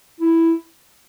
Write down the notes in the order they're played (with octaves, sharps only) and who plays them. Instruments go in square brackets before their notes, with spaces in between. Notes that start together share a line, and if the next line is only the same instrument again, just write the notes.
[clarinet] E4